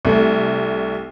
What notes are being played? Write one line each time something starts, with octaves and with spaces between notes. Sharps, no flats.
C2 A3